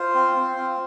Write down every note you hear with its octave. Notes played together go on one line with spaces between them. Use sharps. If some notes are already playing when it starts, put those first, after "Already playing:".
Already playing: F4 C5
C4
C4
F4